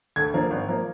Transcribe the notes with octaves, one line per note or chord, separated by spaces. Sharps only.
D2 G#6
D3 F3 A#3 D4
G#1
F3 A#3